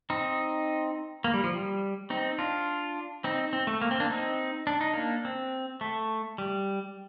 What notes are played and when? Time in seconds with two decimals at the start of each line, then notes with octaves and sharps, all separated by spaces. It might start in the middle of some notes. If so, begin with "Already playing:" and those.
0.10 C4 D#4
1.24 A#3
1.34 G3
1.44 F3
1.53 G3
2.10 C4 D#4
2.38 D4 F4
3.24 C4 D#4
3.53 C4
3.67 A3
3.82 A#3
3.91 C4
4.00 A#3 D4
4.10 C4 D#4
4.67 D4
4.81 D#4
4.94 A#3 D4
5.25 C4
5.81 A3
6.38 G3